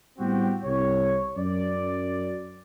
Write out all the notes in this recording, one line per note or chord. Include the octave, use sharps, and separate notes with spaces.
A2 G3 B3 C4 F#4 G4
C2 C#5
F#2 D5